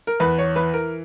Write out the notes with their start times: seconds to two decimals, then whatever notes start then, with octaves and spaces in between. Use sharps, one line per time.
0.07 A#4
0.20 E2 B4
0.38 C#5
0.56 E3 B4
0.74 A#4